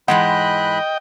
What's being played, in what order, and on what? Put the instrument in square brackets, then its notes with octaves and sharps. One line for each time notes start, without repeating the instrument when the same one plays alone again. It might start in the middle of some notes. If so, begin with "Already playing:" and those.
[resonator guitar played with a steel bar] G#2 E3 G#3 [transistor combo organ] D#5 G5 [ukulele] F#5 [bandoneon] B5 F#6